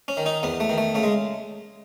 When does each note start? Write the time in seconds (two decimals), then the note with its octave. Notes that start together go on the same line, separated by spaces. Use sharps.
0.08 C#4
0.17 D#3
0.26 D#4
0.43 E2 B3
0.60 A3
0.69 D#3
0.78 A3
0.95 C#3 A3
1.03 G#3